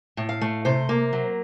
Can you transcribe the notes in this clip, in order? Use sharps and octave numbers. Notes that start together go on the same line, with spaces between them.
A2
F5
A3
C3 C5
A#3
F#3